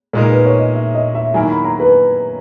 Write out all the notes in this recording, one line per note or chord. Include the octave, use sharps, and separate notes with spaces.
A#2 G#3 D#4 A#4
B4
C#5
D#5
E5
D#5
E5
D#3 F#3 A#3 E4 A#4 G#5
B5
A#5
B4